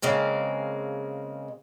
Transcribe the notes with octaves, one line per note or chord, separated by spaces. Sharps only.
C#3 G#3 A#3 C4